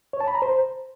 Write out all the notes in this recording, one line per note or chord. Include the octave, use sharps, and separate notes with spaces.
C#5
A5
B5
A#5
C5